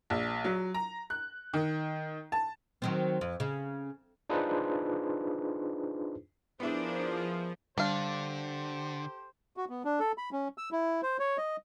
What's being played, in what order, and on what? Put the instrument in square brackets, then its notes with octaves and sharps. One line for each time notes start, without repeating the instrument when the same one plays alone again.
[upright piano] A#1
F#3
A#5
F#6
D#3
A5
[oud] D#3 F#3 C4
F2
C#3
[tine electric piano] D4 D#4 F4 G#4 B4 C5
[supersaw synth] F3 [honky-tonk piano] B3 E4 [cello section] D4 [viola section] G#4 A#4 C5
[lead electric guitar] D3 [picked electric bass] G3 [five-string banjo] D4 F5 [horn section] G4 A4 C5
[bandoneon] F#4
B3
D4
A4
B5
C#4
E6
E4
C5
C#5
D#5